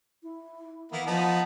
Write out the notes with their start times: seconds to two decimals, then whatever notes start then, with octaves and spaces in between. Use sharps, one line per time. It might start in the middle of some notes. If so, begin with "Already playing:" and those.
0.23 E4
0.92 E3 A#3 B3 E4
1.07 F3 B3 D#4 A5